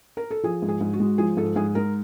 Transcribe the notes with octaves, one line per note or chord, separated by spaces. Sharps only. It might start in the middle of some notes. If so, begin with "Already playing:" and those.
A#4
A4
F3 G#4
G#2
G#4
G#2
F#4
G#3
F3 G#4
G#2 A4
G#2 G#4
G#3 A#4